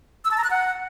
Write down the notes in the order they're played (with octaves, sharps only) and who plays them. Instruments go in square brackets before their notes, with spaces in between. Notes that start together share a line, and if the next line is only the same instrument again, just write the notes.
[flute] E6
A5
A#5
F#6
F#5